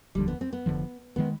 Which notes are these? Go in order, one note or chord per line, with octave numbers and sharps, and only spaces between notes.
F1 D#2 D3 F3 G3
B3
C4
B3
F1 D#2 D3 F3
D#3 G#3 B3